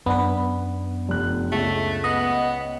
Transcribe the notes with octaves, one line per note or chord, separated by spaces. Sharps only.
F#2 B3 D4 B4
F1 F#6
C#2 A3
B3 D#5